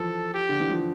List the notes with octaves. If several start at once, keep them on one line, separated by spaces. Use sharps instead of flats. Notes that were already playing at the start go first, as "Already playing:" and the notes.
Already playing: E3 F3 A4
G4
D3
E3
F3